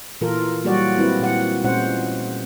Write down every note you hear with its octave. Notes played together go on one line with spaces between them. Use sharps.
A#2 E3 F4 A4 A#4
F#3 G3 A#3 F#4 G4 D5
G#3 C4 E4 B4
A#2 F#5
A#2 G#3 C#4 C5 F#5